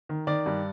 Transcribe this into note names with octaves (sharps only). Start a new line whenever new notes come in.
D#3
D#3 D5
G2